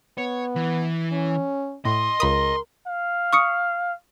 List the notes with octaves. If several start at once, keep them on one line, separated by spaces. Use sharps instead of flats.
B3 C#5
E3
C#4
A2 D#5 C6
C#2 A#4 B5 D#6
F5
C#6 D#6 C#7